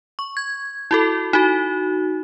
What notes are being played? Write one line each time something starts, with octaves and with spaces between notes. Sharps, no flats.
C#6
G#6
E4 F#4 A4
D#4 F#4